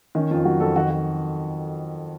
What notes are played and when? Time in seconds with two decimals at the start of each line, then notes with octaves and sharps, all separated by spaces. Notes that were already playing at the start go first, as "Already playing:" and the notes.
0.15 D#3 C#4
0.31 F2 F4
0.45 F#3 F#4
0.60 F2 A4
0.76 D#3 F#4
0.90 F#4